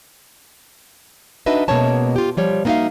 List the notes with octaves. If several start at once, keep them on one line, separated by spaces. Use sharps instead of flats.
D4 D#4 F#4 B4 D#5 E5
B2 G#3 A#3 C#4 C#5 A5
F4 G4
F3 G3 C#5
A#3 B3 D#4 F#4 E5 F5